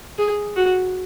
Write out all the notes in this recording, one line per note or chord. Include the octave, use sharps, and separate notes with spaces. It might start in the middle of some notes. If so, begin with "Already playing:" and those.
G#4
F#4